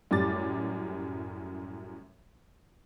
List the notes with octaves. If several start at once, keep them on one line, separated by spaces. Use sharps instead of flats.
F#2 A2 G3 D6 A6